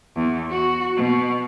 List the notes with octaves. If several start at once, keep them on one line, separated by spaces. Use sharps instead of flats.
E2
F#4
B2